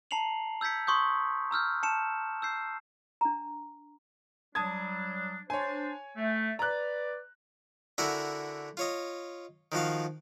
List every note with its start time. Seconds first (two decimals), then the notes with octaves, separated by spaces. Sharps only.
0.11 A5 A#5 C7 C#7 F7 F#7
0.61 E6 G6 G#6 B6 C#7
0.87 C6 C#6 D#6 G6
1.51 A#5 E6 F6 G6
1.83 A5 C#7 E7
2.42 E6 G6 C7
3.21 D4 A#5
4.55 F#3 G3 D4 A5 D#6 G#6
5.50 D4 C5 C#5 G#5
6.17 A3
6.59 B4 D5 A#5 F#6
7.98 D3 E4 F#4 A#4 F#5 G#5
8.77 F4 C#5 D#5
9.72 D#3 F3 F#4 F5